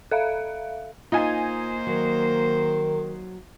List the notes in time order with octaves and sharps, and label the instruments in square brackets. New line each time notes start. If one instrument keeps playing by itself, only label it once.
[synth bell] A4 E5 F5
[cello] A#3 C5 [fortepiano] D#4 G#5 [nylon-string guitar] F4
[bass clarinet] D#3 [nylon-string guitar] F#3